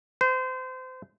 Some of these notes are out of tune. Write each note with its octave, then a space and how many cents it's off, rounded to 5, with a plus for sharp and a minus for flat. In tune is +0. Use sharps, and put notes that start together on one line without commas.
C5 -30